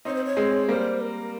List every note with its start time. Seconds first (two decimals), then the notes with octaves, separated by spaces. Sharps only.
0.05 C4 D#4 C#5
0.15 C5
0.25 C#5
0.37 G#3 C4
0.68 G3 A#3 C5
1.00 A#4